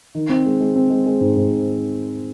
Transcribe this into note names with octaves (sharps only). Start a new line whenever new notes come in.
D#3
C4
G#3
G#3
C4
G#3
G#3
G#2
G#2